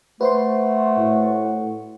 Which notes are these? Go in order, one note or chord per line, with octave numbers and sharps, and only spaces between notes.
A3 F#4 B4 C5 C6
A2